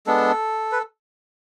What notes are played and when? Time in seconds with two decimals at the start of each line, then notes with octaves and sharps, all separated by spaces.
0.07 G#3 B3 D4 A4
0.72 B4